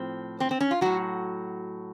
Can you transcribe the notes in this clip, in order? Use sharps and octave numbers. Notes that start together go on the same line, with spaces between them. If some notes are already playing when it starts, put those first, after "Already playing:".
Already playing: A2 F3 C4
C4
C4
C#4
F4
A2 F#3 F#4